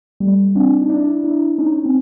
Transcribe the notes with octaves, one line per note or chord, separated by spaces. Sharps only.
G3 A3
C4 D4
D#4
D4 E4
D4 E4
C#4 D#4
C4